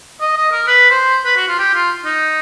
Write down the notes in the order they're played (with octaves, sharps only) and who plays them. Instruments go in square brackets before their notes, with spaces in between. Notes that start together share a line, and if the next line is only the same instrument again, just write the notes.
[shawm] D#5
D#5
A#4
B4
C5
B4
F#4
F4
G4
F4
D#4